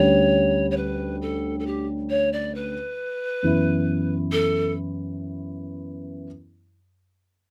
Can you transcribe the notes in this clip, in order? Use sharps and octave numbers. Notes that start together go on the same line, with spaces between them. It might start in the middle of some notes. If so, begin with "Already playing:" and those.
Already playing: D2 D3 G3 C#4 C#5
C#5
B4
A4
A4
G4
C#5
D5
B4
F#2 E3 B3 E4
A4